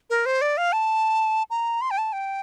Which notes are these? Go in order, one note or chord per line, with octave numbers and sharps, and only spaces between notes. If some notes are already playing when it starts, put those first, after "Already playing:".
A#4
C5
D5
F5
A5
A#5
C6
G5
A5
G5